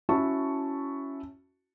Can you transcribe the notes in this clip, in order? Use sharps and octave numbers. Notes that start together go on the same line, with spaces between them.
C#4 E4 F#4 A5 C#6